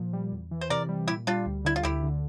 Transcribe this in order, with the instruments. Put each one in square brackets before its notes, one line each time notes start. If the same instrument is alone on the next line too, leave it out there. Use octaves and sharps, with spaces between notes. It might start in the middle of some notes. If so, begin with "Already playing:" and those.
Already playing: [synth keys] A#2 F3
G3
E2
E3
[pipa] C5
[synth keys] C3 [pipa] A#4 D5
[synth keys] G3
[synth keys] A#2 [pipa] E4 G4
[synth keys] G3 [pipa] D4 F4
[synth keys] D2
[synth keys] D3 [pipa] E4
[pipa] F4
[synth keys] D2 [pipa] E4 G4
[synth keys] D3